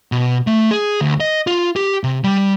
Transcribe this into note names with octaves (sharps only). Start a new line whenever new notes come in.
B2
A3
G#4
D2
D#5
F4
G4
C3
G3